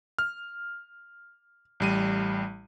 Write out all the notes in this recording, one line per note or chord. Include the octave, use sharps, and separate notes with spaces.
F6
A1 G3 D#7